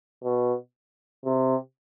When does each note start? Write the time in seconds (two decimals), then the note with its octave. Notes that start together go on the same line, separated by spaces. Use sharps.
0.24 B2
1.25 C3